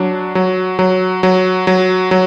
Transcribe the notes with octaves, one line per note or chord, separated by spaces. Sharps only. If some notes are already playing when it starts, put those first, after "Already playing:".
Already playing: F#3 D4
F#3
F#3
F#3
F#3
F#3